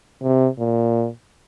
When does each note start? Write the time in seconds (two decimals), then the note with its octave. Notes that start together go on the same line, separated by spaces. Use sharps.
0.23 C3
0.59 A#2